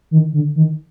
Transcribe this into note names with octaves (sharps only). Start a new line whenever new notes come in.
D#3
D3
D#3